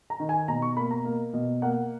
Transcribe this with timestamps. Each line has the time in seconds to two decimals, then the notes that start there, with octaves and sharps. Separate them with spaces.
0.10 A#5
0.20 D#3
0.29 G#5
0.48 B2 A#5
0.62 C#6
0.77 A#3 B5
0.91 A#5
1.05 A#3
1.34 B2
1.62 A#3 F#5